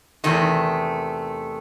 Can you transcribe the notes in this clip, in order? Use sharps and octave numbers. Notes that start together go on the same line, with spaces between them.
E2 C3 D#3 A3